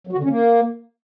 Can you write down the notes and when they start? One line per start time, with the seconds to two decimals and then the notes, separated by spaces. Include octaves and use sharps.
0.07 F#3
0.13 F#4
0.18 D3
0.24 C#4
0.29 A#3